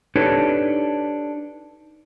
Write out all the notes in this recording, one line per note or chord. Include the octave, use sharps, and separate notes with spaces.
D4 D#4 G4 A4 B4 C#5